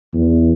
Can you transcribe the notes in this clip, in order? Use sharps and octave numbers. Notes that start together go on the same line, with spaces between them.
E2